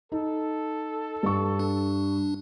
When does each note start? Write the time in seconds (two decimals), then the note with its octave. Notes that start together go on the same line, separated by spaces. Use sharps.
0.12 D#4 A4
1.23 G2 C#6
1.59 D4